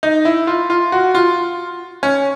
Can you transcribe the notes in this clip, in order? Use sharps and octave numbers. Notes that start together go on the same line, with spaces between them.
D#4
E4
F4
F4
F#4
F4
C#4